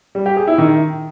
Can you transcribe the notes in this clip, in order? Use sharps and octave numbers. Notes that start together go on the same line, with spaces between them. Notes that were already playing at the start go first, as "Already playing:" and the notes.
G3
G4
G#4
E4
D#3